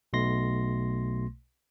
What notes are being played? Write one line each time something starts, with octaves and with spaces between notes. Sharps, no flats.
B1 B2 A3 C6 A#6